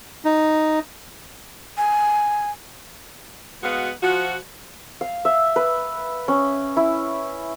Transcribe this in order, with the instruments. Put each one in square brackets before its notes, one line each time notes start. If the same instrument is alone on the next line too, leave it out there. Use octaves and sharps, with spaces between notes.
[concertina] D#4
[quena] G#5
[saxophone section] B2 G#3 B3 F#4 F5
F3 F#4
[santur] F5
E5
B4
C#4
E4